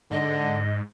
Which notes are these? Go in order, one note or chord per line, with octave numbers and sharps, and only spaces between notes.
G#2 D3 D#5